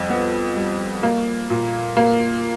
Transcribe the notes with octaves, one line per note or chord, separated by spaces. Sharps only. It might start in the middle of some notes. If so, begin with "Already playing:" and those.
Already playing: F2 G3
B3
G3
A#3
A#2
A#3